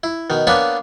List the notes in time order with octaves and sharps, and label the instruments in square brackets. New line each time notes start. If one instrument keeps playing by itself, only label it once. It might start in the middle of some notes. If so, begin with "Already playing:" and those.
[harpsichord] E4
B2 D#3
A#3 B3 D4 C#5 G#5 B5